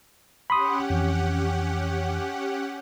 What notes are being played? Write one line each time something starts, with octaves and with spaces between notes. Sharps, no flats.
C#4 G4 F#5 B5 C6 D#6
F2 E3